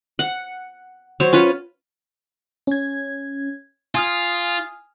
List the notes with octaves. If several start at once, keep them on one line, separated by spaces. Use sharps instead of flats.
F#5
F#3 C5 C#5
C#4 F4 B4
C#4 G#6
F4 G#5 D#6 F6